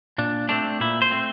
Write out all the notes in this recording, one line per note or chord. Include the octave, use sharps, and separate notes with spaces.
A#2 D4
A3 C4 D4
A#2 E4
C5
A3 C4